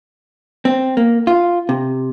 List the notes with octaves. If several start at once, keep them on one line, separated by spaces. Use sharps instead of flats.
C4
A#3
F4
C3